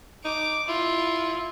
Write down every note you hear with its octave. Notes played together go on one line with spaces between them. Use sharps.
D#4 D6
E4 F4